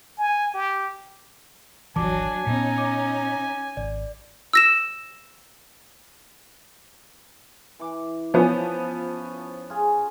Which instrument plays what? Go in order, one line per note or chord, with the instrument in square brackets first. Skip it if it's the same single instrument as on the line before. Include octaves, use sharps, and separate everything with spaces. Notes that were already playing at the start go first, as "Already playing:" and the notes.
[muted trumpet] G#5
G4
[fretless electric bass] D1 G#1 E3 [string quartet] F#3 D4 [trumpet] G#5 [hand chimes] A5 D6
[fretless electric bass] A#2 B3 [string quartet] C#4 D#4
[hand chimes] D6
[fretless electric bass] G#1 [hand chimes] D5
[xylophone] E6 A#6 E7
[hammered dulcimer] E3 D6
[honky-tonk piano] F3 B3 [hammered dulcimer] C#4
[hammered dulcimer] F4 G#4